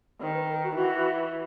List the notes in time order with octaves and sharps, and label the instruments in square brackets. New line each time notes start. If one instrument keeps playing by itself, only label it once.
[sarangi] D#3 [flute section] C5
[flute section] B4
A#4
F#4
[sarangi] E3 [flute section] F#4